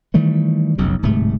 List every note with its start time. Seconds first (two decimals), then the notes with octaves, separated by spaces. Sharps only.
0.14 D#3 E3 G3 A3
0.78 F1 B1 F#2 C#3
1.03 D1 G#2 C3 A3